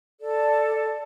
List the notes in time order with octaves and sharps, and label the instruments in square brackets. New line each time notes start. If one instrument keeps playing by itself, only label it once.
[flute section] A4 D5